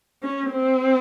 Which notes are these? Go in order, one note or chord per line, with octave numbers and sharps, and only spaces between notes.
C#4
C4